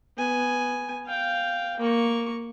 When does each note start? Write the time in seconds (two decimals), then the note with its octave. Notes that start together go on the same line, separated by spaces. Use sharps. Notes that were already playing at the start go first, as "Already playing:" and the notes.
0.17 B3 G#5
1.06 F5 G5
1.79 A#3 C#6